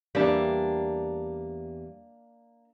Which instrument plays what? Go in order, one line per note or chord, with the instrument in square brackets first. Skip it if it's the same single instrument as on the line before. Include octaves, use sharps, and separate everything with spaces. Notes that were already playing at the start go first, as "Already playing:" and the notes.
[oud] E2 G3 [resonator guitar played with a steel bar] A#3 D4